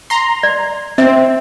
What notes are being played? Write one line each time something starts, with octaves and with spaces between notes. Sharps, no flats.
A#5 C6
D5
C4 E5